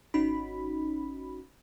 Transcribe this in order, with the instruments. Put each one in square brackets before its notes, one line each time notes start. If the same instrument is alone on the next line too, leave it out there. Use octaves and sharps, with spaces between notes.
[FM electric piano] G#1 C#4 D#4 F#4 B5